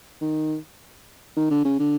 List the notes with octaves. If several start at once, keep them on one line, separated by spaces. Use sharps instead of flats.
D#3
D#3
D3
C#3
D3